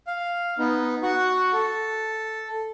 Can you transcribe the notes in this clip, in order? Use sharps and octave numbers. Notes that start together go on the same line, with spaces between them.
F5
B3 D#4
F#4 F#5 C#6
A4